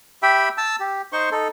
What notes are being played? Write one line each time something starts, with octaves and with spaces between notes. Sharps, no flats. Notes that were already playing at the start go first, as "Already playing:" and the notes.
G4 E5 G5 B5
A5 E6
G4
D#4 C5 C6 C#6
D#4 A4